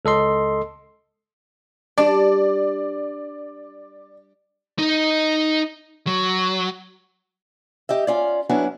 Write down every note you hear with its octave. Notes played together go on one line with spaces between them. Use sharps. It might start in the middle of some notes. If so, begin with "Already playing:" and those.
C#2 A4 D#5 C6
G3 D4 G4 D5
D#4 D#5
F#3
G4 D#5 E5
C#4 F4 D5
F#3 B3 C#4 D4 E4 F#4